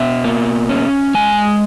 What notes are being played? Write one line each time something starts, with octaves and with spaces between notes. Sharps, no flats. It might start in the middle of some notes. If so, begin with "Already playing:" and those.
Already playing: B2 E5
A#3
C#4
G#3 G#5